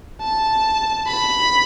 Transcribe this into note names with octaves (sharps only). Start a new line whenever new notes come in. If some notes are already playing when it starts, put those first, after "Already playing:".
A5
B5